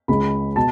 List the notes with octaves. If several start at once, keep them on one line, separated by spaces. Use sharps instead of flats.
C#2 C#3 G#3 B5
B2 A5